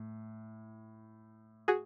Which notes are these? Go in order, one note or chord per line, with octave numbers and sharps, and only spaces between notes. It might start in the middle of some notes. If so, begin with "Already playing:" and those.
Already playing: A2
F#4 G#4